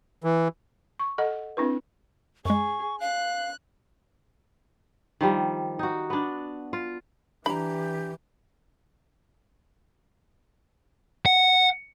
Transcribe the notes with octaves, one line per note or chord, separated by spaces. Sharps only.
E3
C#6
A4 D#5 F#5
C4 D4 E4 B4
F#2 G#3 G#4 C#6
F5 F#6
D#3 F3 G3
D#4 F#4
B3 D4
F4
E3 D4 G4 A#5 B5
F#5